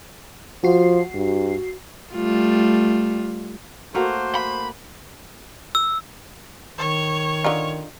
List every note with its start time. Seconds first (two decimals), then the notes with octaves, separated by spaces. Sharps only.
0.64 F3 F#4 C7
1.14 G2
2.12 G3 A3 F4
3.95 A3 A#3 F#4 C5
4.35 B5
5.75 E6
6.78 D#3 C#5
7.44 D3 D#4 F4